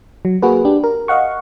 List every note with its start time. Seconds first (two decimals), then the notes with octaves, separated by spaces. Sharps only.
0.25 F#3
0.42 A#3 F#4 G#4 B4
0.65 D4 G4
0.84 A#4
1.08 D#5 F5 F#5 C#6